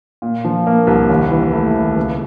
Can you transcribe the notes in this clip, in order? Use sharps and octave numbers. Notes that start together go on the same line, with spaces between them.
A#2
F3
A#3
C2
D#2
E3
A3
D#2
C#2